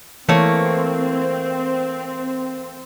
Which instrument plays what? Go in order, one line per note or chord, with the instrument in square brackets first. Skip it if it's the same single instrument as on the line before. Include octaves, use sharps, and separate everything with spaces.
[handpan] E3 [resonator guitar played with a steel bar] A3 A#3 C#5 [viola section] C4